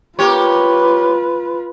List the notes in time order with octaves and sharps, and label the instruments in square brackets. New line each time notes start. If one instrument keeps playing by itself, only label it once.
[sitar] A#3 G4 C#5 [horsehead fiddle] F4 B4